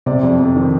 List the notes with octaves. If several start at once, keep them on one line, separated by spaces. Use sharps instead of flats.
C3 D5
F2
F2
D#3